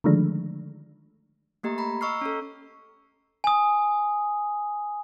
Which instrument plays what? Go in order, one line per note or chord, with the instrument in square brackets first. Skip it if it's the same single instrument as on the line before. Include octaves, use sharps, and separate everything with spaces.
[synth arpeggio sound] D3 D#3 F3 G#3 A3 D4
[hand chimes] A3 A#3 G4 D#5 A#5
A#5 B5
D#5 A#5 C#6 E6 F6 C7
C#4 A4
[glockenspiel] G#5 D#6